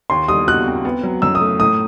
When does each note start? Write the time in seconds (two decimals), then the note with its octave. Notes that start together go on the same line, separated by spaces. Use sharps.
0.10 D#2 C6
0.28 G3 D#6
0.47 F#4 F#6
0.67 C4
0.85 B3
1.03 F#3
1.22 F#2 E6
1.35 D#6
1.41 A3
1.60 A2 D#6